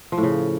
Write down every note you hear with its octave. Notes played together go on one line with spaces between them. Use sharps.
F3
A2
C#3